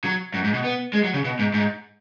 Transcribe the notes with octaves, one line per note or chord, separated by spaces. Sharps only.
F#3
F#2
G#2
B2
B3
G#3
F#3
C#3
B2
G#2
G#2